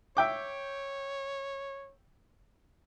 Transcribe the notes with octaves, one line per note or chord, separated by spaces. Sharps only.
C#5 E5 G5 D6